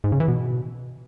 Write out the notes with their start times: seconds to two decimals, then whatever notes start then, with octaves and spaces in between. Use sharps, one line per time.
0.04 G#2
0.12 C#3
0.20 E3
0.28 B2